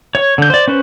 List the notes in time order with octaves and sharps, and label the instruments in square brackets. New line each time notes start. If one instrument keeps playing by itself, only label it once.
[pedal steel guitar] C#5
D3 G6
C5 D5
C#4 B4 C5